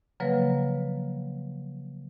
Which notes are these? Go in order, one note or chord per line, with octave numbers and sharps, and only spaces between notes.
C#3 F3 F#3 A#3 B4